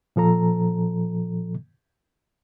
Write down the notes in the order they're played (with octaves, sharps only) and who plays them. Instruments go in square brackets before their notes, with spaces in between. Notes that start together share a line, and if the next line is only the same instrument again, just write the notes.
[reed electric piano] A#2 F3 A4 A#5